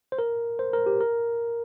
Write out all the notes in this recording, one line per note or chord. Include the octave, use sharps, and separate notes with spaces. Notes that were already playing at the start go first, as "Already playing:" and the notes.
C5
A#4
C5
A#4
G4
A#4